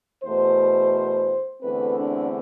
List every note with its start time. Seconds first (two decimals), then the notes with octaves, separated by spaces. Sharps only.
0.24 E2 B2 A3 C5
1.62 E2 D3 A3 C4 B4
1.97 D4